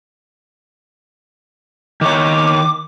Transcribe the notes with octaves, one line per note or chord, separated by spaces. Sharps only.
D#3 C#5 D6